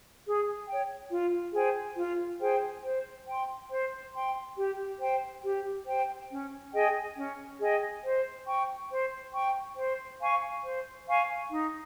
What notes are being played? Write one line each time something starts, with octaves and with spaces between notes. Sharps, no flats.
G#4
C#5 G5
F4
G#4 C5 G5
F4
G#4 C5 G5
C5
G5 C6
C5
G5 C6
G4
C5 G5
G4
C5 G5
C#4
G#4 D#5 G5
C#4
G#4 D#5 G5
C5
G5 C#6
C5
G5 C#6
C5
F5 G#5 C#6
C5
F5 G#5 C#6
D#4